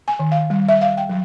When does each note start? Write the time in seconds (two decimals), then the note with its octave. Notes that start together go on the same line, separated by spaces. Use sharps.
0.08 G#5
0.19 D#3
0.32 F5
0.50 G3
0.69 E5
0.81 F5
0.97 G5
1.09 F#3